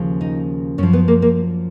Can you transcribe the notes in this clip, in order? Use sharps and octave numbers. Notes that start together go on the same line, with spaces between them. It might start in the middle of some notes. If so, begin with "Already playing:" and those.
Already playing: D#2 C#3 F3
D#4
F#2 F3 C#4
B3
A#3
A#3